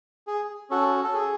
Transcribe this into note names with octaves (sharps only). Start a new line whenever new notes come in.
G#4
C#4 F#4 A4
A4
G#4